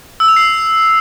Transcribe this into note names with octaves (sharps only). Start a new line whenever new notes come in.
E6
F7
C7